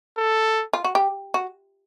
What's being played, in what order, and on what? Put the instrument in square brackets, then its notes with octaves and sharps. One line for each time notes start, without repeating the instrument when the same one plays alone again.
[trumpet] A4
[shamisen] F4
F#4
G4
F#4